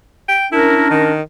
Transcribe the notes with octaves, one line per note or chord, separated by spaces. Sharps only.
G5
C#4 D4 E4 A#4
D#3